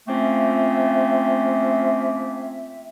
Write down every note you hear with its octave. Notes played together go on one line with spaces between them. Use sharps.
F3 A3 A#3 C4 C#4 E5